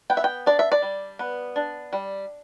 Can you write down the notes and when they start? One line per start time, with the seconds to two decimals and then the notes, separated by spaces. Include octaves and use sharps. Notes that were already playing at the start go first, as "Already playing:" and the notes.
0.10 B3 G5
0.17 E5
0.24 G5
0.46 D4 D5
0.59 E5
0.72 D5
0.82 G3
1.19 B3
1.56 D4
1.93 G3